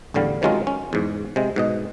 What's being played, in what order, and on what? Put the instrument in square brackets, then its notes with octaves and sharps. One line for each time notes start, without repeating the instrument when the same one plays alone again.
[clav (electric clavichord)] A1 E2 D3 G3 F5
C3 D#3 F#3 G#3 C#4 F4
C#4
E2 G#2
C3 G#3
G#2 B2 D#5